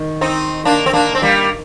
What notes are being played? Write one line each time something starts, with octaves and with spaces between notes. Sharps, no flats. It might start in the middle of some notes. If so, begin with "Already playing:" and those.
Already playing: D#3
C4 D#4
A#3 D4
C4
A#3 D4
C4
G3 A#3